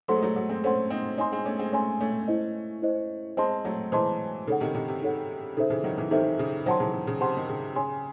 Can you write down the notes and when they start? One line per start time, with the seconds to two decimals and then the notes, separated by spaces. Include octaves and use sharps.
0.08 F#3 A3 A4 C5 F#5 C6
0.16 G#3
0.22 F#3 A3
0.36 F#3 A3
0.49 G#3 C4
0.64 A3 C#4 A4 C5 F#5 C6
0.90 C4 D#4
1.18 C4 D#4 C#5 G#5 C6
1.32 G#3 C4
1.45 A3 C#4
1.59 G#3 C4
1.72 A3 C#4 C#5 G#5 C6
2.01 A3 C#4
2.28 E4 C5 D#5
2.82 E4 C5 D#5
3.37 G#3 C4 C5 D#5 A5 C6
3.65 F#3 A3
3.92 E3 G#3 C5 D#5 A5 C6
4.47 C#3 D#4 A4 C#5 F#5
4.60 C3 D#3
4.74 C3 D#3
4.88 C3
5.01 D#4 A4 C#5 F#5
5.57 C#3 D#4 A4 C5 E5
5.70 C#3 E3
5.84 D#3 F#3
5.98 C#3 E3
6.11 C3 D#3 D#4 A4 C5 E5
6.39 C#3
6.66 D#3 F#3 C5 F#5 A5 C6
6.80 C#3 E3
6.93 C#3
7.07 C#3
7.20 C3 C5 F#5 A5 C6
7.37 D#3
7.49 C#3
7.75 C#3 C#5 G#5 C6